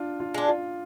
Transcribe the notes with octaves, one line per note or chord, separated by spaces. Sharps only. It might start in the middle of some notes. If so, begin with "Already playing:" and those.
Already playing: D4 F4
F4
G#3 D4
F4